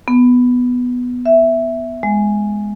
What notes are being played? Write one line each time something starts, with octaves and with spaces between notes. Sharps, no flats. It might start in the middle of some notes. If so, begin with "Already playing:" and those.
B3
E5
G#3